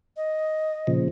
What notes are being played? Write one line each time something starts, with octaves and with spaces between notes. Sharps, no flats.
D#5
A#2 C#3 F3